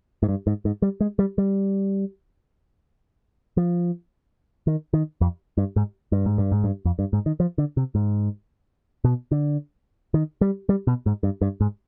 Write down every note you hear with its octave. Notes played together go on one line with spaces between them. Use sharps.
G#2
G2
G#2
G#2
G3
G#3
G3
G3
F3
D#3
D#3
F2
G2
G#2
G2
G#2
G2
G#2
G2
F2
G2
G#2
D#3
F3
D3
C3
G#2
B2
D3
D#3
G3
G3
B2
G#2
G2
G2
G#2